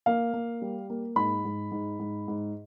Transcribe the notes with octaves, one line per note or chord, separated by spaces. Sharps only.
A#3 F5
A#3
G3
A#3
G#2 B5
G#2
G#2
G#2
G#2